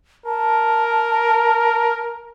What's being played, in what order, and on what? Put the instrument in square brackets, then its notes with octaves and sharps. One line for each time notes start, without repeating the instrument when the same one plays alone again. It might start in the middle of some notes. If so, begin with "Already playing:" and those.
[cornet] A#4 [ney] A5